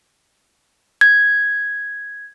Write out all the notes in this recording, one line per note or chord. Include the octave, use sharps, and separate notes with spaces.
G#6